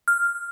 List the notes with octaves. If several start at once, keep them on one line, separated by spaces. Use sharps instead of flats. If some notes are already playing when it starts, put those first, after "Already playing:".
F6